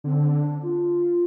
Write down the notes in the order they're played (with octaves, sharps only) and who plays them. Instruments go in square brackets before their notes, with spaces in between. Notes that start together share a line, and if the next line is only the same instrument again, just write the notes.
[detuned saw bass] D3 [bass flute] C4
[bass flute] D4
F4